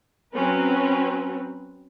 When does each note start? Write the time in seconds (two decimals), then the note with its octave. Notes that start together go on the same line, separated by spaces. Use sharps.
0.34 F#3 C4 C#4 B4